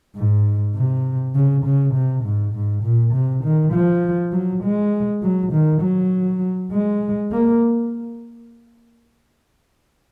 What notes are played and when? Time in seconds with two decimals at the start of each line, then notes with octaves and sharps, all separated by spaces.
0.16 G#2
0.75 C3
1.35 C#3
1.65 C#3
1.94 C3
2.24 G#2
2.54 G#2
2.83 A#2
3.13 C3
3.43 D#3
3.72 F3
4.32 F#3
4.63 G#3
5.22 F#3
5.52 D#3
5.81 F#3
6.72 G#3
7.31 A#3